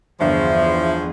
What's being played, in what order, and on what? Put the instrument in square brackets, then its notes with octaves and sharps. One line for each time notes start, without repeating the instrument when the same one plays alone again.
[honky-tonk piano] G1 [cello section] E2 G#4 [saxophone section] F3 [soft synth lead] E5